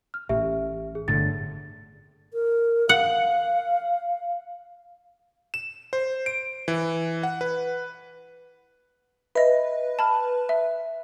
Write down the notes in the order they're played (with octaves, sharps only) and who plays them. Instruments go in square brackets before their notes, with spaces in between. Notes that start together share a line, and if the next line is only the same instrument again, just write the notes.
[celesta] F6
[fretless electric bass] A1 [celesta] G4 E5
[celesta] G#4
[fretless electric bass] G1 A2 D3 [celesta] A6
[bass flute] A#4
[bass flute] F5 [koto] F#5
[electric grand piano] E7
C5
D7
E3
F#5
B4
[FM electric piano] B4 [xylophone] D#5 E5
[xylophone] A5 B5 F6
E5